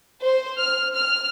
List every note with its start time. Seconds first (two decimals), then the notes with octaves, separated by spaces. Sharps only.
0.23 C5
0.59 F6
0.95 F6